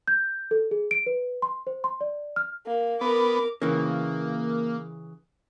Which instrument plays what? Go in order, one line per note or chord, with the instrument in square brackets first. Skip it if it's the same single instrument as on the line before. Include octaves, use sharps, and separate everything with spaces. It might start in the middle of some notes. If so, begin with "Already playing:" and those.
[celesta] G6
A4
G#4
D7
B4
C6
C5
C6
D5
F6
[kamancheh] A#3
[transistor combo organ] B3 [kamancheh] A#4 D6
[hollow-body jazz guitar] C#3 E3 [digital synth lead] A#3